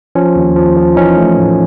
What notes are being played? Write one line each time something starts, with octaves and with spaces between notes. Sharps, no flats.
F3 C#4
D#2
F3
F3
E3 C#4 D#4
A3
A2